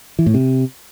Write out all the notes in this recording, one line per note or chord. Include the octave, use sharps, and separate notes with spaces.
E3
A2
C3